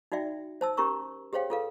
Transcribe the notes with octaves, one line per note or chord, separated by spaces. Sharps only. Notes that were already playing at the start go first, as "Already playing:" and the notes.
D#4 F#4 D5 E5 G5
C5 A5 E6
C#4 G4 A#4 A#5 C#6 E6
G4 G#4 C5 C#5 F5 G5
F4 G#4 A4 B4 F5